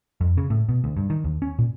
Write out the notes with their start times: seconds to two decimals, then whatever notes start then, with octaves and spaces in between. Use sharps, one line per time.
0.21 F2
0.38 C#3
0.50 A2
0.69 B2
0.84 D2
0.97 G2
1.10 D#3
1.24 D#2
1.42 C#4
1.59 A#2